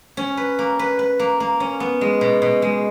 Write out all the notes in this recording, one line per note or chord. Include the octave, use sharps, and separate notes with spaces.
C#4
B4
A#3
B4
B4
A#3
A#3
C#4
B3
G#3
B2
B2
G#3